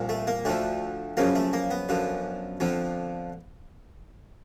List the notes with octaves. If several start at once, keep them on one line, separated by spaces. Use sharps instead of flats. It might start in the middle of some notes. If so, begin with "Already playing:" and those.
Already playing: C2 A#2 F3
A3
A#3
D2 D3 F3 A3
F#2 C#3 F3 A#3
A3
A#3
B3
F#2 D3 F3
F2 D3 F3